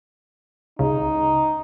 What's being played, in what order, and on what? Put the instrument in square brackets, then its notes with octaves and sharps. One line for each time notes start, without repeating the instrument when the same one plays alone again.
[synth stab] C#2 C#3 [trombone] D#4